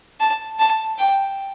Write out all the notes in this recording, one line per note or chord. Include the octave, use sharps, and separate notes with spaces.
A5
A5
G5